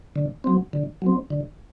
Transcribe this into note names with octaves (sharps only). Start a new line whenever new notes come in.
D3
F#3 C4
D3
F#3 C4
D3